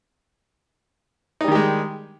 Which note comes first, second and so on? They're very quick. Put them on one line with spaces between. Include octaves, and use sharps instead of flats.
D#4 G3 D#3 G4 G#3